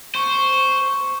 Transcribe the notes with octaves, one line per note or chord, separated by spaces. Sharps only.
C5 C#6